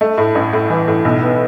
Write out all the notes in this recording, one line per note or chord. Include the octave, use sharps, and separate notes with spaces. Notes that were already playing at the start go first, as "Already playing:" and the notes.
A3
A2
A1
A2
E3
A2
B1
B3